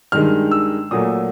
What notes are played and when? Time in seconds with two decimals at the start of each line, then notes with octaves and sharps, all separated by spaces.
0.12 G2 D#3 G#3 F6
0.51 E6
0.91 A#2 F#3 A3 D#6